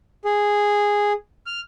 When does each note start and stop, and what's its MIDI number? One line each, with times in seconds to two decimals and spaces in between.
0.25 1.12 68
1.46 1.60 89